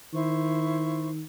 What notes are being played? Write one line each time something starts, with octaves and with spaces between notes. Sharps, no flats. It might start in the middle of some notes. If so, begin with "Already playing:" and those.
D#3 E4 C5 C#6